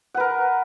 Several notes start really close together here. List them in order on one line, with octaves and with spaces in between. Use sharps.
F#5 B4 A#4